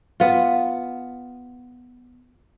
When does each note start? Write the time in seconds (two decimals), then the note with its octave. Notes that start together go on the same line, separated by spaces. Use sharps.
0.20 B3 F4